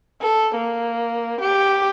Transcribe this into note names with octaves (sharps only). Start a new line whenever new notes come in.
A4
A#3
G4